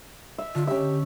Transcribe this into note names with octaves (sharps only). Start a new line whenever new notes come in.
E5
D3 F4
C#4 G4 E5